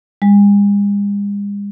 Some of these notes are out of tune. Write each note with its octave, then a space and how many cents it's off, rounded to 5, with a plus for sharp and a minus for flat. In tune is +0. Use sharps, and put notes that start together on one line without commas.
G#3 -45